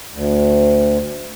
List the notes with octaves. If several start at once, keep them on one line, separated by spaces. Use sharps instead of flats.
D2